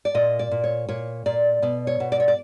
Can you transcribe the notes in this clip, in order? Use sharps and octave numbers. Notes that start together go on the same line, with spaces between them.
D5
A#2 D#5
D5
A#2
C#5
A#2 C#5
A#2 D5
B2 D5
C#5
B2
D5
C#5
D5